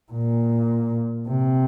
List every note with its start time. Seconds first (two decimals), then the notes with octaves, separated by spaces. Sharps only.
0.12 A#2
1.28 C3